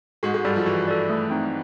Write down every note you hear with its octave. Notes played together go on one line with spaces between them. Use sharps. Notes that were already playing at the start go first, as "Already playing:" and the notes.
G#2 G#3 F#4
G#2 G#3
G2 G3 A4 D5
F3
E3 F#4
A4 D5
A3
C4 D#4